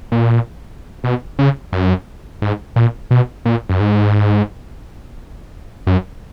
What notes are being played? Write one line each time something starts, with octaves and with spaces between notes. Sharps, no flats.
A#2
B2
C#3
F#2
G#2
A#2
B2
A#2
F#2
G#2
F#2